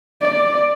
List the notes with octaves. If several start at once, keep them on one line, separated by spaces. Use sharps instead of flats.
D5